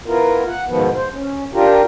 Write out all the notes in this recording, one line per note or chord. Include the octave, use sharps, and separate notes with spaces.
B3 E4 F4 A#4
F#5
G#2 B2 D#3 F3 B3
C5
C#4
D4 F4 G4 A#4